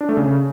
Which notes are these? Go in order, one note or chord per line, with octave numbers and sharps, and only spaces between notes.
D4
A3
C#3